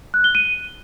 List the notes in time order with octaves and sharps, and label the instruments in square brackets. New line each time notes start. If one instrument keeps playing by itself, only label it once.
[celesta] F#6
G7
D#7